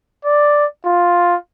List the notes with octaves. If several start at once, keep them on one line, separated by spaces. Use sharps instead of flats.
D5
F4